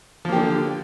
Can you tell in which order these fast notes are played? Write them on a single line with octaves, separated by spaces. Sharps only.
F3 A#3 G4 D3